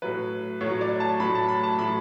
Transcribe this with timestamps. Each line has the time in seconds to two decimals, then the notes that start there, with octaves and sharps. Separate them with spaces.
0.02 A2 F#3 B4
0.61 A2 C#5
0.66 F#3
0.81 D5
1.00 A5
1.20 A2 F#3 B5
1.35 A5
1.49 B5
1.63 A5
1.78 A2 F#3 B5